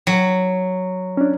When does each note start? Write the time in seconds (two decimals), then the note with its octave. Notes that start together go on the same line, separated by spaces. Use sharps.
0.07 F#3
1.17 C#4 D4